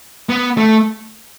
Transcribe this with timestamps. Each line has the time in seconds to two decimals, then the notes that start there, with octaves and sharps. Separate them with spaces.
0.29 B3
0.57 A3